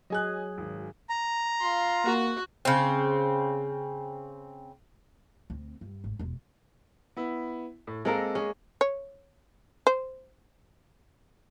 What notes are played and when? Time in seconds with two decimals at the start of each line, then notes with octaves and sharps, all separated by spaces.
0.10 F#3 G#4 D#5 G#5 F#6
0.58 G#1
1.09 A#5
1.61 F4 F5 C6
2.05 A#3 F#4 F#5
2.65 C#3 C4
5.50 D2 C4
5.81 G2
6.04 G#1
6.19 E1 G#3
7.17 B3 E4
7.87 A2
8.05 G#3 A#3 C4 A4 A#4
8.35 C#4 G#4
8.81 C#5
9.87 C5